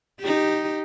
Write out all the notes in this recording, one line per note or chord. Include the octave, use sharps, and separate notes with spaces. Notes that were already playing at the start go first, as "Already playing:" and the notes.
D#4 G4